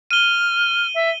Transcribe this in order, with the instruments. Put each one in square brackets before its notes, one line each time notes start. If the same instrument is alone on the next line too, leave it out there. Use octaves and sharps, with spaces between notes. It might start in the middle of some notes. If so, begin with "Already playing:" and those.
[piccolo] F6 [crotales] D#7 G7
[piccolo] E5